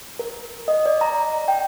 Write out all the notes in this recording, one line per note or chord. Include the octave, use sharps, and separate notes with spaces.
A#4
D#5
D5
A#5
G5